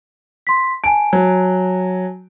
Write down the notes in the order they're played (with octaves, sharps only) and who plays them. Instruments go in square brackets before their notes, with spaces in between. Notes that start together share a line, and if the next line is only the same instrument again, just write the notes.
[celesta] C6 B6
[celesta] G#5 A5 [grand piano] D7
[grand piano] F#3